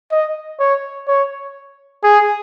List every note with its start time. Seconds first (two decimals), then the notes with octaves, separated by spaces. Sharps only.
0.12 D#5
0.60 C#5
1.08 C#5
2.04 G#4